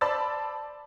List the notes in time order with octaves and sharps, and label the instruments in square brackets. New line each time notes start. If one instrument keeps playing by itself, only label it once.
[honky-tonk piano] C5 D5 A5 B5 E6 A6